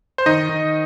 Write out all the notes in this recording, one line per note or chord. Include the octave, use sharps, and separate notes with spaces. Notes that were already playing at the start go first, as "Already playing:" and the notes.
C5
D#3 D#4 D#5
D#3